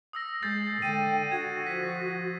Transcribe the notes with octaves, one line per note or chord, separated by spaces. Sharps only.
D#6 E6 A#6
G#3 G6 A6 C7
D3 G5 D#7
F#4 G#6 E7
F3 B6